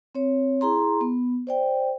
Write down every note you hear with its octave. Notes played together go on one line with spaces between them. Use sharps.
C4 C#5
E4 G#4 A#5 C6
B3
C5 D5 G5